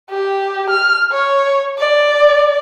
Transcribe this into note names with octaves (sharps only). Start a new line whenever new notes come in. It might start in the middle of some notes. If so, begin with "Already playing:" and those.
G4
F6
C#5
D5